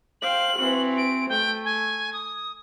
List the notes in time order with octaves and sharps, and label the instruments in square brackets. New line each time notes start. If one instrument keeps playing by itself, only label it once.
[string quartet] C5 F5 G5 [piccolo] F#7
[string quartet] E3 C4 F#4
[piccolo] D7
[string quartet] A3 [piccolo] G5
[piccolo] G#5
D#6